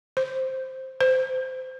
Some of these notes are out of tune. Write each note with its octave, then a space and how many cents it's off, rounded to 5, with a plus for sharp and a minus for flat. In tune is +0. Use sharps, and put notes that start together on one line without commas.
C5 +5
C5 -20